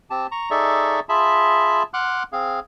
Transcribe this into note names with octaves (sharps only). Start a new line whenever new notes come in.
C4 G4 A5
A#5 C#6
D#4 G#4 A4 D5 E5 C#6
F4 G#4 E5 A5 B5
F#5 C6 D6 F6 F#6
C4 G#4 F5